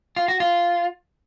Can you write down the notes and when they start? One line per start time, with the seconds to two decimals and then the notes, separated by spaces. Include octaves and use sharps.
0.16 F4
0.28 F#4
0.40 F4